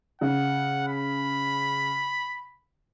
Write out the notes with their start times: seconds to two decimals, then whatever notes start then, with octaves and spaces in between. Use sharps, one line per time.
0.21 C#3 F#5
0.88 B5